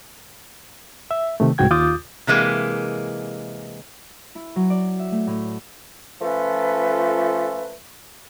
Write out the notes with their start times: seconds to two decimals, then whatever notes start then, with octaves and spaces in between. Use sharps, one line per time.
1.11 E5
1.40 C3 D#3 A3
1.58 C2 G#2 F#4 G5 G#6
1.71 D#2 F4 D6 D#6 G6 A6
2.27 C3 E3 G#3 A#3
4.35 E4
4.56 F#3
4.70 D5
4.99 E5
5.12 A3
5.27 A2
6.21 F3 A3 C#4 F4 A4 B4